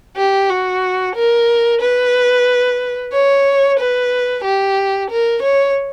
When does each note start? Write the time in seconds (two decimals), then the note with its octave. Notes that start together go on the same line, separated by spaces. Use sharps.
0.17 G4
0.50 F#4
1.15 A#4
1.81 B4
3.13 C#5
3.79 B4
4.44 G4
5.10 A#4
5.42 C#5